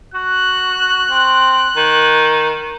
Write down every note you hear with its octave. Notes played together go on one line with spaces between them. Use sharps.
F#4 F#6
C4
D#3